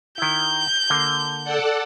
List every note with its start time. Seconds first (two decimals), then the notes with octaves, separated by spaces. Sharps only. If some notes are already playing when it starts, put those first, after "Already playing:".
0.18 D#3 E4 G6
0.90 D3 A#3
1.44 A4 D5 F#5